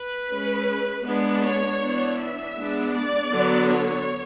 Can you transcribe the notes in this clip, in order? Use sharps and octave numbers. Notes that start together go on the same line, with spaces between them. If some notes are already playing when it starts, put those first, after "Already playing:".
Already playing: B4
G#3 C#4
G#3 B3 D4
C#5
E3 B3 D4
E5
G#3 B3 D4
D5
D3 F#3 B3 D4
C#5